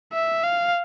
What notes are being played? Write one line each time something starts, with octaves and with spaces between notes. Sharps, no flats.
E5
F5